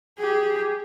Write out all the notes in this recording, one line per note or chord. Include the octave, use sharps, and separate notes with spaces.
G4 G#4